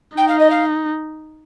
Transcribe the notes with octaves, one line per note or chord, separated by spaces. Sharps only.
D#4 G5
F5
D#5
F5